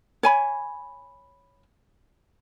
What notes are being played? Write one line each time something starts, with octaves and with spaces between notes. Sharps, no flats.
C#5 G#5 B5